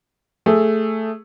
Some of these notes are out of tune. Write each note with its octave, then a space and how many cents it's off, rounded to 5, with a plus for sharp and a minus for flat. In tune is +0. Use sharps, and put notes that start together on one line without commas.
A3 +5 G#4 +0